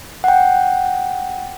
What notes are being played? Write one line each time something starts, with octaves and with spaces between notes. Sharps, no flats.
F#5 G5